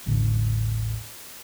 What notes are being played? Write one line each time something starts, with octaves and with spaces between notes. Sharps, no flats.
E1 A1 A2 D3